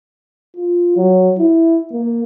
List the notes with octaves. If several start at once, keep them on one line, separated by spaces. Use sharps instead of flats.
F4
F#3
E4
A#3